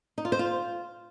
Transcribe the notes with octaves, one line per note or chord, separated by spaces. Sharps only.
D#4
F4
C5
F4